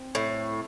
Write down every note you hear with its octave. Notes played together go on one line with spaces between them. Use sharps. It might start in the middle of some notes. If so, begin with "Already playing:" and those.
Already playing: C4
A2